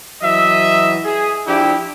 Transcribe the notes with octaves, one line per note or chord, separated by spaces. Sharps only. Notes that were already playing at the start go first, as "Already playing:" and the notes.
E3 F#3 D#5 E5
G#4
F3 D4 E4 G4